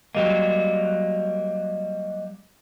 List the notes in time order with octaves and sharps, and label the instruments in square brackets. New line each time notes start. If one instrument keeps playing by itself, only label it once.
[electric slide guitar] F#3 G3 A#3 [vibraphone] D#5